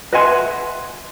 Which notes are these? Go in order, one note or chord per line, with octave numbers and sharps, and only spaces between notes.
B4 D#5 E5 F#5 G#5 C6